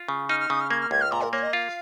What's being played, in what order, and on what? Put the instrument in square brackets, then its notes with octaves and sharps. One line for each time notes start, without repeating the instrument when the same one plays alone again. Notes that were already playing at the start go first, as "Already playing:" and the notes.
Already playing: [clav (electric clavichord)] F4
C#3
[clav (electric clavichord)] D#4 [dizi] F6
[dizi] F6
[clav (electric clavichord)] C#3 [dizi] D#6
[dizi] F6
[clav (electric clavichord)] A#3 [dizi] G#6
[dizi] F6
[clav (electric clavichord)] C#2 [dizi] G#6
[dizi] F6
[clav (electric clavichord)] A#2 [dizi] A#5
[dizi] A#4
[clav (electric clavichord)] A#3 [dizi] C#5
[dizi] D#5
[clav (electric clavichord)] F4 [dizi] F5